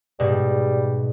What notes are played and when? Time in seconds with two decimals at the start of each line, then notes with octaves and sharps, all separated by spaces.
0.20 G#2 B2 G3